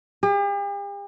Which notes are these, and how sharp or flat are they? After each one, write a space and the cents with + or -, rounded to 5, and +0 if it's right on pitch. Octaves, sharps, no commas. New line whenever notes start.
G4 +45